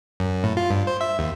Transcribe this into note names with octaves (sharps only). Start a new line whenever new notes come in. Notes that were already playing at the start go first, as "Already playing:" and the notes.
F#2
A2
F4
G2
C5
E5
D#2